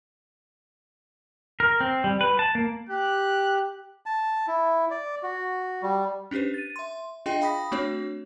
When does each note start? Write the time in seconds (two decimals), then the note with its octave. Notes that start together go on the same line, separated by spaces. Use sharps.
1.60 A#4
1.81 C4
2.04 G3
2.21 B4
2.39 A5
2.55 A#3
2.89 G4 F#6
4.06 A5
4.48 E4
4.90 D5
5.23 F#4
5.83 G3
6.31 C#4 D4 G4 B4 C5
6.54 A6 D#7
6.76 E5 C6
7.26 D4 F4 G#4 D#5 G5 C6
7.41 F5 G5 B5 D#6 A#6 B6
7.72 A3 C4 D4 F#4 C#5